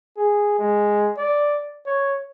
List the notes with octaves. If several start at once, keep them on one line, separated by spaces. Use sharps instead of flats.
G#4
G#3
D5
C#5